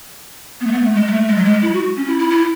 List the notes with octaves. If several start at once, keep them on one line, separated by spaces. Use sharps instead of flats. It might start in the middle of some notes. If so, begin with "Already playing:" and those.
B3
A3
B3
A3
G#3
G#3
A3
G#3
F#3
G#3
E4
F#4
C#4
E4
E4
E4